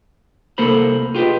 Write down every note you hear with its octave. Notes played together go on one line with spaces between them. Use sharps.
C2 A#3 A4 A#4 C5 B5
F4 G4 G#4 B4 D#5